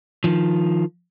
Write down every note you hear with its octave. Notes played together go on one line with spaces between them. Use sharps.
D#3 F3